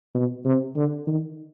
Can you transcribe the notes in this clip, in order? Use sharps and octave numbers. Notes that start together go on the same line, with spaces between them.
B2
C3
D3
D#3